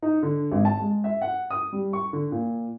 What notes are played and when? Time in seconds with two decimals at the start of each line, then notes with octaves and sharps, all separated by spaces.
0.02 D#4
0.23 D3
0.52 G#1
0.65 A5
0.80 G#3
1.04 E5
1.22 F#5
1.50 D#6
1.73 G3
1.93 C#6
2.13 D3
2.32 A#2